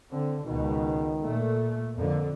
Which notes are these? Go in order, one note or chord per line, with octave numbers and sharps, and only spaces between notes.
D3 C4
C#2 B2 D#3
A#2 A3
F2 D3 A#3